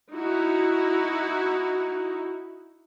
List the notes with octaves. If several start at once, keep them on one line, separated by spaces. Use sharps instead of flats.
D#4 E4 F#4